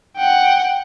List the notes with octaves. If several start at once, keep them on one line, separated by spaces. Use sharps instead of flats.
F#5 G5